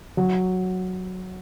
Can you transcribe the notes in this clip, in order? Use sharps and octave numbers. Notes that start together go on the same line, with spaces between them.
F#3